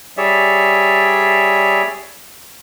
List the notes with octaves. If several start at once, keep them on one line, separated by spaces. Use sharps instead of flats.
G3 G#4 C#5 D5 E5